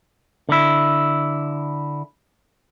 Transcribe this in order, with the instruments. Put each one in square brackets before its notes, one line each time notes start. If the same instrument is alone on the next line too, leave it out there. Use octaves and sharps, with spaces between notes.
[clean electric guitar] D3 E4